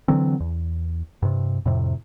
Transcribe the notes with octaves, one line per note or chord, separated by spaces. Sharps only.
D3 E3 F#3 C4
E2
G2 C3
F2 A2 C3